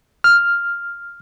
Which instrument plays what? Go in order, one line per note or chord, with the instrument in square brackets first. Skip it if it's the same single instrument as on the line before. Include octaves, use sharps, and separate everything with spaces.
[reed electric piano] F6